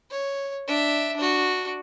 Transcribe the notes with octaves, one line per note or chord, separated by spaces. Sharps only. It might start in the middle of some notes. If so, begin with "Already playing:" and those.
C#5
D4 E5
D4 F#4